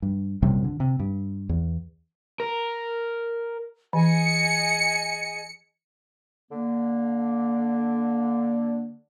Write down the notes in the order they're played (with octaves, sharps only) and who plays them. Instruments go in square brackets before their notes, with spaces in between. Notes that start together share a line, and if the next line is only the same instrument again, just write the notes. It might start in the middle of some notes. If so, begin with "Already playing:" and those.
[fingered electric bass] G2
A#1 F#2 C3 G3
D3
C3
G2
E2
[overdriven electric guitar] A#4
[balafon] E3 [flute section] G#4 D#5 G#5 [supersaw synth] C#7
[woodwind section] D3 A#3